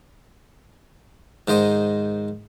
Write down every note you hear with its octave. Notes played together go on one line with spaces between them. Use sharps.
G#2 D#3 C5 D#5